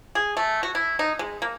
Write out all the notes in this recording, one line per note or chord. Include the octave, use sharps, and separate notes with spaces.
G#4
A3
F#4
E4
D#4
G#3
A#3